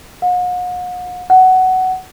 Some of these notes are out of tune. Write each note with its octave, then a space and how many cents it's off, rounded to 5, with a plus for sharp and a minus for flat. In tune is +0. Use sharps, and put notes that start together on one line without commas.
F#5 -45
F#5 +15